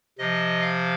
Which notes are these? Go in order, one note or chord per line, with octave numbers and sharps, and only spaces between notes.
C3 F3 D#5
F5